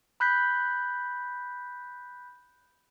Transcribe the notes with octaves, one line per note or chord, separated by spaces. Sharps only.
B5 F#6 G6 B6